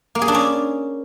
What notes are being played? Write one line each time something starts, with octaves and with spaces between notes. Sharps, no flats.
A#3
G#4
D4
C#4